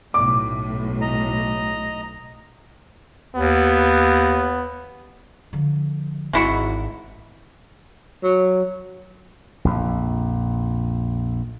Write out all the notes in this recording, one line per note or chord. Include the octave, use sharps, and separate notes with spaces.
B1 A2 D6
D#5 A#5
D#2 B3
D3 F3
G#1 G#3 E4 F#4
F#3
A#1 F2